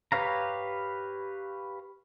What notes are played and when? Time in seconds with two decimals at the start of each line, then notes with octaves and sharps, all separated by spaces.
0.12 G4 B4 C#5 F5 A#5